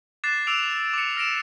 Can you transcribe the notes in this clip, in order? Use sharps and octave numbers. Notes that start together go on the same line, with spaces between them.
D6 F#6 A6 C7 E7
D6 E6 D7 F7
D6 C#7
F6 A#6 D7 E7